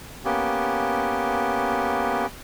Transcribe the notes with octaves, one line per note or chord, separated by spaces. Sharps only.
A#3 B3 C#4 G4